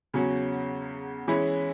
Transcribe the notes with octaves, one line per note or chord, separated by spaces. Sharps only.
E2 C#3 F#3 C#4 F#4
E3 G#3 C#4 E4 G#4